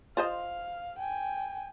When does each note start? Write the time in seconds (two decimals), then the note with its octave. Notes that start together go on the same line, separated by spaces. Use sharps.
0.17 F4 C5 D#5 F5
0.99 G5 G#5